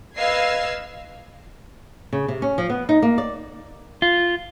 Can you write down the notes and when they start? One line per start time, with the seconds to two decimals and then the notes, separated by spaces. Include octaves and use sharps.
0.17 B4 D#5 F5 E6 G#6 C7
2.13 C#3
2.28 C3
2.42 C#4
2.58 F3
2.70 B3
2.89 D#4
3.02 A#3
3.18 D5
4.02 F4